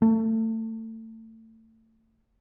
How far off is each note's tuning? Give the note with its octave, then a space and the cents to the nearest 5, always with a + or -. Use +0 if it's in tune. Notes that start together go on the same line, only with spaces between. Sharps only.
A3 +30